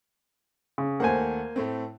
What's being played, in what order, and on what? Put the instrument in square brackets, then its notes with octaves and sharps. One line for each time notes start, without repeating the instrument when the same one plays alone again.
[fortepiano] C#3
[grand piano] D#2 A3 F#5 [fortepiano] A#3 C5 G#5
[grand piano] A2 A3 C4